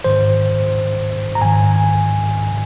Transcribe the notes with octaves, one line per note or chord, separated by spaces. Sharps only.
G#2 D#3 C5
A#5
G#2 D#3 G#5
G#5